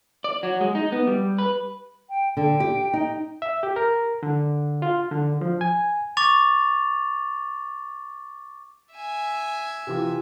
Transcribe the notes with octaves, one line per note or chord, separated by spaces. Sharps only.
D5
F#3
G#3
D#4
B3
G3
B4
G5
D3 G5
G4
D#4
E5
G4
A#4
D3
F4
D3
F3
G#5
C#6 D6 A6 F7
E5 G#5
C3 E3 F4